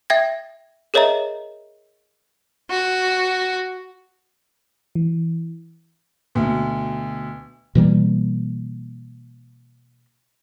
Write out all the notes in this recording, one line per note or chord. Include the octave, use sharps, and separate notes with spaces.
E5 G5 G#6 A#6
G#4 A#4 C#5 D#5 E5 A#5
F#4
E3
D2 B2
B2 E3 G3 A#3